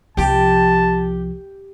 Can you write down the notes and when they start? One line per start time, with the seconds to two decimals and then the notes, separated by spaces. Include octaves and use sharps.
0.17 C2 F3 G4 A5